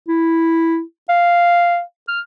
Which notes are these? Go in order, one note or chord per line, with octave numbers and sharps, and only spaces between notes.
E4
F5
F6